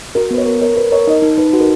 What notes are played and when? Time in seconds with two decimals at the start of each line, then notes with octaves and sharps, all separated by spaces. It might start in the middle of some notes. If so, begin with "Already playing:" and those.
0.15 F#4 A#4
0.31 B3 B4
0.38 C#5
0.46 A#4
0.61 A#4 C#5
0.76 A#4 B4
0.92 A#4 C#5
1.07 D#4 D#5
1.22 D#4
1.38 D#4 B4
1.53 F#4 B4
1.61 A#4